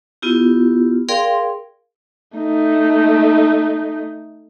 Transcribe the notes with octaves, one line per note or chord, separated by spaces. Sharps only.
B3 E4 F4 G4
G#4 A#4 D5 F5 G5 C6
A3 D#4